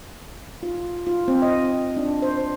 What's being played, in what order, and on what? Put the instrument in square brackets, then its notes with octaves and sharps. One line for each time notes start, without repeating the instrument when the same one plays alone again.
[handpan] F4
F4
C4
D#5
D4
C5